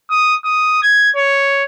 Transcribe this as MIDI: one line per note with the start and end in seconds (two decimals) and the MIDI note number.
0.11 0.35 87
0.45 0.79 87
0.83 1.10 92
1.16 1.64 73